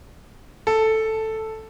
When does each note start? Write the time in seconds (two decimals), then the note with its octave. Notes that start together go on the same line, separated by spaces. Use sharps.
0.67 A4